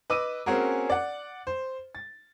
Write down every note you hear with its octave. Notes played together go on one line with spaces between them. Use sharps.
B4 D#5 D6 E6 D#7
A#3 C4 C#4 F#4 G#4 A#4
D5 F#5
C5
A6